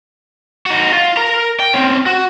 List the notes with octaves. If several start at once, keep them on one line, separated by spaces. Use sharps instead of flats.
D#4 F#4
F4
A#4 A#5
G5
C4 C#4
F#4